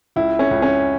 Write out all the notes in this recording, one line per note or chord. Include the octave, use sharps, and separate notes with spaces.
C#2 E4
C#4
C#2
C#4